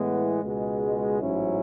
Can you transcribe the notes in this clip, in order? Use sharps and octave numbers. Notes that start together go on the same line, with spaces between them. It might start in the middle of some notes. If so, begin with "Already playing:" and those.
Already playing: A2 E3 G#3 B3
C#2 B2 G#3
A1 G#2 F#3 C#4 E4